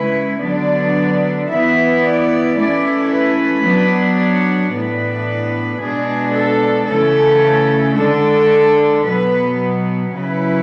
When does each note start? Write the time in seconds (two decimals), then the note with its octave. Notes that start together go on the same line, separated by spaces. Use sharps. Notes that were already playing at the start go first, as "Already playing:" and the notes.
Already playing: C#3 G#3 C#4 E4 B4
0.40 D3 F#3 B3 D4 D5
1.48 E3 B3 E4 E5
2.01 D5
2.56 E3 A3 C#4 E4 D5
3.10 B4
3.63 F#3 B3 D4
4.18 C#5
4.72 A2 E3 B3 D4 B4
5.79 B2 G#3 D4 G#4
6.34 A4
6.88 C#3 E3 A3 C#4 A4
7.96 D3 G#3 D4 A4
9.03 B2 F#3 B3 B4
10.11 C#3 F#3 C#4 E4 B4